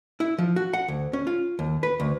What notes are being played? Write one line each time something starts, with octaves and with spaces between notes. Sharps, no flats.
E4
F3
F#4
F#5
D2
C#4
F4
D#2
B4
D2